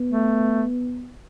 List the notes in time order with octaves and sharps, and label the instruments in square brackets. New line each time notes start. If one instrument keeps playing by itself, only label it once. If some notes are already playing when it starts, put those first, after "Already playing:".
Already playing: [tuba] B3
[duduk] A3